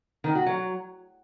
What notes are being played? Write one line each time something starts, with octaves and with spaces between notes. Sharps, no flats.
D#3
F#4
F#3